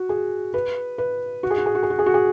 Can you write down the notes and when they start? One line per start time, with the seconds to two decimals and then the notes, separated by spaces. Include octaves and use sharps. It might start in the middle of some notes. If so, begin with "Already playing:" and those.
Already playing: F#4
0.09 G#4
0.54 B4
0.98 B4
1.43 F#4
1.51 G#4
1.58 F#4
1.66 G#4
1.75 F#4
1.83 G#4
1.90 F#4
1.99 G#4
2.06 F#4
2.14 G#4